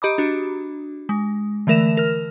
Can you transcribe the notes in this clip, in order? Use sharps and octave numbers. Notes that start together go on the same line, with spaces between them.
G4 D#5 A#5 B5 D6 D#6
D4 F#4
G#3
D3 E3 A3 A#4 E5 E7
A#4 F6